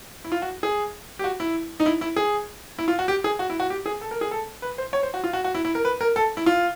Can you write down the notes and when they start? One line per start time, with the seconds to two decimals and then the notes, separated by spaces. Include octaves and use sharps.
0.24 E4
0.32 F4
0.42 F#4
0.63 G#4
1.19 G4
1.24 F#4
1.40 E4
1.80 D#4
1.86 E4
2.01 E4
2.16 G#4
2.79 E4
2.88 F4
2.99 F#4
3.08 G4
3.24 G#4
3.39 F#4
3.50 E4
3.60 F#4
3.70 G4
3.86 G#4
4.01 A4
4.11 A#4
4.21 G#4
4.31 A4
4.62 B4
4.78 C5
4.93 C#5
5.03 C5
5.14 F#4
5.24 F4
5.33 F#4
5.44 F#4
5.55 E4
5.65 E4
5.75 A#4
5.85 B4
6.01 A#4
6.16 A4
6.37 E4
6.46 F4